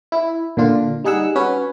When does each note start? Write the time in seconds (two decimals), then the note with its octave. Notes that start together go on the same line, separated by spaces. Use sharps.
0.12 E4
0.57 A#2 D3 D4 F4
1.04 G3 D#4 G#4 F#5 E6
1.36 C#4 F#4 B4 C#5